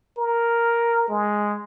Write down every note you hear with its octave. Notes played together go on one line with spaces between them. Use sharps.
A#4
G#3